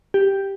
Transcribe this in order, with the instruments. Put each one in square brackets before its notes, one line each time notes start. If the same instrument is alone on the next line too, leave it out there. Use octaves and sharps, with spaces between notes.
[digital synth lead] G4